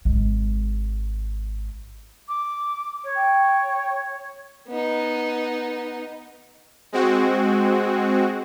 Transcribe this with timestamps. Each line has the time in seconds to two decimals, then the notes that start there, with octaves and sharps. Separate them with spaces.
0.05 G#1 G#3
2.28 D6
3.04 C#5
3.16 G5
4.68 B3 D#4
6.92 G#3 C4 F#4